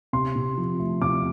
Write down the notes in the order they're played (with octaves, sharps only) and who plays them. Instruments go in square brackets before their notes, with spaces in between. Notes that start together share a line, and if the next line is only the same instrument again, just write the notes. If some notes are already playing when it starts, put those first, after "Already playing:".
[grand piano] C3 C6
C3
F3
A3
C3 D6